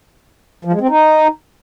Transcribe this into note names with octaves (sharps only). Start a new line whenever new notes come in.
F3
G#3
C4
D#4